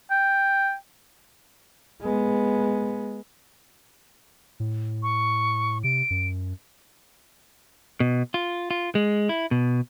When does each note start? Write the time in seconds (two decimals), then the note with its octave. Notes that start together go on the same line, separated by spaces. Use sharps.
0.11 G5
2.02 G#3 B3
4.60 A2
5.03 C#6
5.84 C3 D7
6.10 F#2
8.00 B2
8.34 F4
8.71 F4
8.95 G#3
9.29 E4
9.51 B2